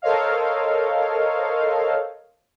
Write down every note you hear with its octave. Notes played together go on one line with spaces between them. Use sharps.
A4 A#4 C5 C#5 D#5 F5